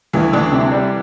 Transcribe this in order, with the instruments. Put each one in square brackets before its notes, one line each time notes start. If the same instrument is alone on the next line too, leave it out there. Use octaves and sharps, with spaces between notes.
[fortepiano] D2 [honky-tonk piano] E3 E4
[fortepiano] D2 [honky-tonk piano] D3 D4
[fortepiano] C3
G3